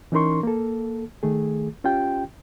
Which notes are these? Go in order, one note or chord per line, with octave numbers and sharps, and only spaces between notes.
E3 C#4 D#4 A#4 C6 C#6
A#3 A4
D#3 A3 G#4
C#4 F4 G4 G5